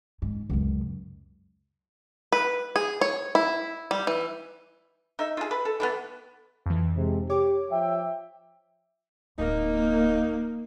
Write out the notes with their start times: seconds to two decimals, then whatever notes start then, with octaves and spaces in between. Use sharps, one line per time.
0.22 G#2
0.50 C#2 F#2
2.32 B4
2.76 G#4
3.01 C#5
3.35 E4
3.91 G3
4.07 E3
5.19 D#4 E5
5.37 F4 G#4
5.51 B4
5.65 A4
5.80 E3 G3 B3
6.66 F2 E3
6.96 G#2 C3
7.30 G4 C#5 D6
7.71 F3 E5 G5
9.39 D1 A#3 D#4